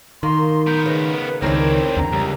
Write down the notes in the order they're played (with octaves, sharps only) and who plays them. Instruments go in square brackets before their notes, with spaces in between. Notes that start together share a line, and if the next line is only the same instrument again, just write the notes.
[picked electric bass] D#3 [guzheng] A#3 [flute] C6
[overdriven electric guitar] B3 A#4 [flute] G6
[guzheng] C#3 D#5 [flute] B4
[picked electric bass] C#2 D#3 [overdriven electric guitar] C4 D4 [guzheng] E4 A#4 [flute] C#5
[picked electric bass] E2 D3 [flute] A#5
[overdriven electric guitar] C#2 [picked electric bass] G3